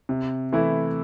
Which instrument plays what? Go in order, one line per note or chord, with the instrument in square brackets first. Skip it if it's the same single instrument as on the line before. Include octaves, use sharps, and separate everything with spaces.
[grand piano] C3
E3 A3 E4